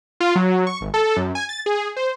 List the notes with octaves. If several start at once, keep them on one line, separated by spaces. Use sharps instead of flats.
F4
F#3
C#6
G#1
A4
F#2
G#5
A6
G#4
C5